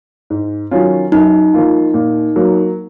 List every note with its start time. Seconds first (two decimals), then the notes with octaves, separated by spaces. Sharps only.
0.30 G#2
0.71 D#3 F#3 C#4 F4
1.12 F#2 D#4
1.54 F3 A#3 F4
1.94 A#2
2.36 F#3 A#3